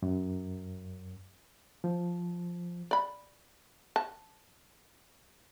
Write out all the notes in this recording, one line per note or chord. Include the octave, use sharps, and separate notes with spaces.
F#2
F3
D5 B5
A5